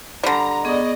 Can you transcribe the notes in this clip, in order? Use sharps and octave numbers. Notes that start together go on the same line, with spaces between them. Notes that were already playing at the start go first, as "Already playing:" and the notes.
D3 G3 A#5
B3 G#4 D5 D#5 C#6